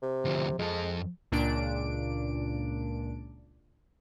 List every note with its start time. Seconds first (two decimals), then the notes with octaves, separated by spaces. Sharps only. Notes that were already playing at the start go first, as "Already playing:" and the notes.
0.02 C3
0.25 D2 F3
0.59 F2 G#3 A4
1.32 C#2 A#2 D4 D7